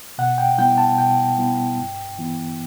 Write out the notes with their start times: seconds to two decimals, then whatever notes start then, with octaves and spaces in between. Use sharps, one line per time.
0.18 B2 F#5
0.38 G5
0.58 G3 B3 E4 G5
0.78 A5
0.98 B2 G5
1.38 G3 B3 E4
1.78 G2
2.18 E3 B3 E4